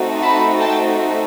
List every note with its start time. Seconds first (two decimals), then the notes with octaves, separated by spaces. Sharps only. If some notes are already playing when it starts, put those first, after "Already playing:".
Already playing: A3 C4 D#4 F#4 A4
0.21 A5 B5
0.60 G5 A5